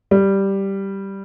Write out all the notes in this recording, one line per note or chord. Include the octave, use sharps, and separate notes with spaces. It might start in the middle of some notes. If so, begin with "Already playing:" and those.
G3